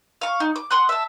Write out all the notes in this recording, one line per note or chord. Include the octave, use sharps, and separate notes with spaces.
F5 C#6
D#4
D6
F#5 C6 D#6 F#6
E5 A5